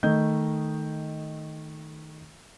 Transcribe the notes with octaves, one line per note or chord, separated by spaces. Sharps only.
D#3 A3 D#5 G6